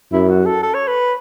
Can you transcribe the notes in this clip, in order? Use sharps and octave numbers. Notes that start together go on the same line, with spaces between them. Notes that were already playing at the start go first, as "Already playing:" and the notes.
F#2 E4
F#4
A4
A4
C#5
B4